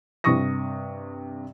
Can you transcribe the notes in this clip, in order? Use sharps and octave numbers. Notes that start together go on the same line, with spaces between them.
G2 C3 C#6 D#6 A#6